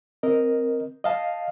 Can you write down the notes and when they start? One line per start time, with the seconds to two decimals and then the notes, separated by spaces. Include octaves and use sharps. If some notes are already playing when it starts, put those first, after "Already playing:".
0.23 C4 A#4 D#5
1.04 D#5 F5 A5